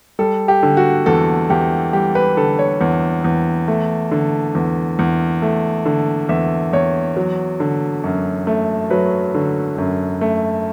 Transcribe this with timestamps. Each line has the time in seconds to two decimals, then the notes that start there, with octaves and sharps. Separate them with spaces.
0.19 G3 A4
0.48 G4
0.63 D3
0.77 F#4
1.06 E2 A4
1.50 E2 G4
1.93 G3 G4
2.15 B4
2.37 D3 A4
2.59 C#5
2.81 E2
3.24 E2
3.68 A3
4.11 D3
4.55 E2
4.99 E2
5.42 A3
5.86 D3
6.29 E2 E5
6.73 E2 C#5
7.17 F#3
7.60 D3
8.04 F#2
8.47 A3
8.90 F#3 B4
9.35 D3
9.78 F#2
10.21 A3